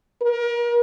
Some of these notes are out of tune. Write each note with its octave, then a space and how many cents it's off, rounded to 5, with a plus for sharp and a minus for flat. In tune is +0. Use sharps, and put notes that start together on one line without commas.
A#4 +35